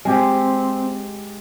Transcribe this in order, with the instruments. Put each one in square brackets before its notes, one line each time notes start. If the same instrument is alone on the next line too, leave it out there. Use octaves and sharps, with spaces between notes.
[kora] G#3 G4 [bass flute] C4